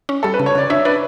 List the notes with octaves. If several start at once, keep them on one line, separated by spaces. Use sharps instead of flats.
C#4
G3 A4
B4
C#3
C#5
C#3 D5
D4 C#5 E5
D4 B4 D5